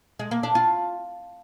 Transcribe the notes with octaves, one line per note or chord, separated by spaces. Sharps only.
G#3
A#3
D4
F4